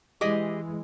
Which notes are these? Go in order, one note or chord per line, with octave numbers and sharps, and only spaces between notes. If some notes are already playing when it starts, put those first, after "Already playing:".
E3 G#3 G4 G#4 D#5